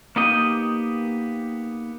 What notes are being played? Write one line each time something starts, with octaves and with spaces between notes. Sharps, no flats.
A#3 B3 D#4 G4 D#5